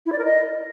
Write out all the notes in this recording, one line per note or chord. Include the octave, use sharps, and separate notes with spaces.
E4
D5
A#4
D#5